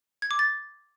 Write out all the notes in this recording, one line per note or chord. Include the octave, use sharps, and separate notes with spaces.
G#6
D6
A6